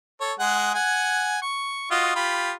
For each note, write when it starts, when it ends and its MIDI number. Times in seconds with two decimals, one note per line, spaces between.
0.21 0.33 69
0.21 0.33 73
0.39 0.72 56
0.39 0.72 68
0.39 0.72 78
0.75 1.39 78
0.75 1.39 80
1.42 1.88 85
1.91 2.15 65
1.91 2.15 66
1.91 2.15 75
2.15 2.52 65
2.15 2.52 67
2.15 2.52 83